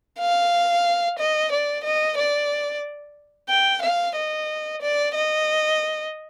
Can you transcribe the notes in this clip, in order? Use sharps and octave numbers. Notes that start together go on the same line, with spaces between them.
F5
D#5
D5
D#5
D5
G5
F5
D#5
D5
D#5